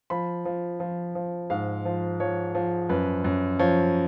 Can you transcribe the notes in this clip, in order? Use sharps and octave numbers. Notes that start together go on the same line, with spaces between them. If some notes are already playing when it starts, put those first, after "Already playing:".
F3 B5
F3
F3
F3
G#2 F5
F3
F3 C#5
F3
F#2 B4
F#2
F3 C#5